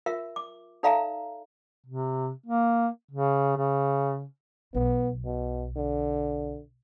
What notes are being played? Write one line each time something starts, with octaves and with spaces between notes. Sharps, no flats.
F4 A#4 E5
D6
D#4 A4 D5 E5 F5 A#5
C3
A#3
C#3
C#3
B1 B3
B2
D3